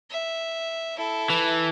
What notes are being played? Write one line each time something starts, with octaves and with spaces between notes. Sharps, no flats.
E5
E4 A4
E3